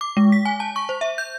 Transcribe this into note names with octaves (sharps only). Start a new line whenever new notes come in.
D6
G#3
B6
G#5
A5
C#6
C5
E5
G6